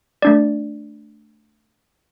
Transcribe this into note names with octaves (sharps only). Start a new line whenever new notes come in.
A3 D4 D5